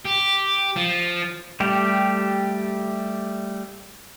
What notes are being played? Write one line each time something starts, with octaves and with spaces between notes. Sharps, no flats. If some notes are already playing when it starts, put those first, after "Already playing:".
G4
F3
G3 A3 G4